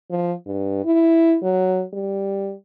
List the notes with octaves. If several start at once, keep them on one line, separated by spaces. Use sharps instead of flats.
F3
G2
E4
F#3
G3